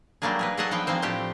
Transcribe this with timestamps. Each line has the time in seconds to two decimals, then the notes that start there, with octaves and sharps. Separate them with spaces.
0.22 F#3 G3 A3 A#3 D4 G#4
0.39 G#4 A#4 B4
0.57 F#3 D4 G#4 A4 D#5 F#5
0.71 F3 B3 F4 G5
0.87 F3 G#3 A#3 C4 C5
1.02 A2 A3 D4 F4 G4